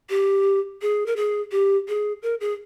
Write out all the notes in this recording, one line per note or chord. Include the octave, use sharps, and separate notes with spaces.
G4
G#4
A#4
G#4
G4
G#4
A#4
G#4